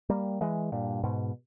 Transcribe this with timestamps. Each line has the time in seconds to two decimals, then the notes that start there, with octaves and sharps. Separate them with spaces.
0.09 G3 A#3
0.41 E3 G#3
0.72 G2 A#2
1.03 G#2 B2